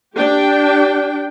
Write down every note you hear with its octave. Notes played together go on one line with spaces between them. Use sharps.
D4 G4 G5